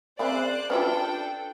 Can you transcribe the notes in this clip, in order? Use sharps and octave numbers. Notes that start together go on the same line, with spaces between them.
C#3 C4 C5 D5 E5 B5 F#6
C#4 D4 F4 G4 A4 B4 E5 G5